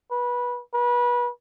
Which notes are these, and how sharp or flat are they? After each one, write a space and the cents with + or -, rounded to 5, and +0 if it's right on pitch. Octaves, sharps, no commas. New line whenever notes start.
B4 -20
B4 -30